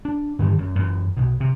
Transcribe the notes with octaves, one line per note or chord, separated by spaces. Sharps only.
D4
G2 D3 D#3 G3
F#2
F#2 E3
B1 B2
C3